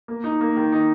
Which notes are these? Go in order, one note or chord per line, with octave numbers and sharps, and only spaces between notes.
A#3
D#4
A#3
D#3
D#4